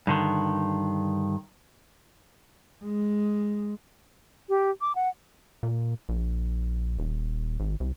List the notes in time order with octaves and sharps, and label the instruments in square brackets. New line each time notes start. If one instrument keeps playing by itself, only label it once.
[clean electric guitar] G2 D3 D#3
[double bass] G#3
[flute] G4
D6
F#5
[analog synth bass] A#2
A#1
D#1
G#1
C2